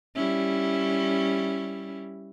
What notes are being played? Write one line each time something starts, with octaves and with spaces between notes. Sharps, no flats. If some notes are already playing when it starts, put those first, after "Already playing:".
G3 C#4 E4